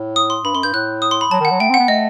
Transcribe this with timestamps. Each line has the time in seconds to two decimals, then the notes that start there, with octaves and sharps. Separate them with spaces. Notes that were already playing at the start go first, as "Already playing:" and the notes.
Already playing: A2
0.16 D#6
0.30 C6
0.44 G2 B5
0.54 F#2 C6
0.63 G2 G6
0.73 A2 F#6
1.02 D#6
1.11 C6
1.21 B5
1.31 F#3 A5
1.40 D#3
1.45 F#5
1.50 F#3
1.60 A3 G5
1.69 C4
1.74 F#5
1.79 B3
1.88 A3 D#5